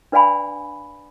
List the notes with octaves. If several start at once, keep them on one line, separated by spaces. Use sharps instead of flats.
D4 B4 D5 F5 G#5 B5